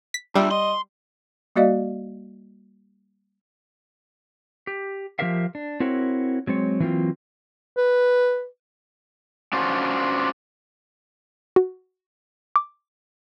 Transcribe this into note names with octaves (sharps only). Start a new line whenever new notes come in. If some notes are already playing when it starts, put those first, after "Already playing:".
B6
G3 D4 F4 E5
D#5 C6
G3 A#3 F#4 D5 D#5 F5
G4
F3 A3 G4 A#4 E5 F5
D4
C4 E4 F#4 A#4 C#5
F#3 G#3 C4 C#5
E3 F#3 A#3 C4 F4
B4
C#4 D4 F4 F#4 C5
F#4
D6